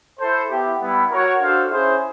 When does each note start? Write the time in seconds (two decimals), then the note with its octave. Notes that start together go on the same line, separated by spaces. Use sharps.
0.19 E4 A4 C5
0.49 B3 E4 G4
0.80 G3 B3 E4
1.10 F#4 A#4 C#5 F#5
1.40 D4 F#4 A4 C5 F5
1.71 C#4 E4 G#4 C5